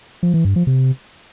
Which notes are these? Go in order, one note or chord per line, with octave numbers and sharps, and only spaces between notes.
F3
E3
G2
F3
C3